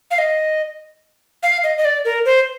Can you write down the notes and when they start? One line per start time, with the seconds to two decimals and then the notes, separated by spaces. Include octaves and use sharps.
0.11 F5
0.18 D#5
1.43 F5
1.64 D#5
1.78 D#5
1.85 D5
2.05 A#4
2.25 C5